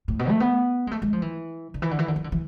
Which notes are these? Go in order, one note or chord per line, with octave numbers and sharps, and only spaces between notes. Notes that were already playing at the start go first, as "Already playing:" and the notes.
A2
B2
A3
B3
G#3
A3
G#3
F3
E3
D3
E3
D3
E3
D3
E3
D3
E3